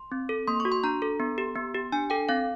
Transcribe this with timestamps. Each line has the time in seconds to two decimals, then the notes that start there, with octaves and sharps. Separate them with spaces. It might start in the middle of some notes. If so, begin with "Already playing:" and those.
Already playing: C6
0.12 C4
0.29 A4
0.47 A#3 C6
0.60 C#6
0.65 F#4
0.72 C6
0.84 D4 A#5
1.02 A4
1.20 B3
1.38 G4
1.55 B3
1.75 G4
1.92 D4 G#5
2.10 A4 G5
2.29 C4 F5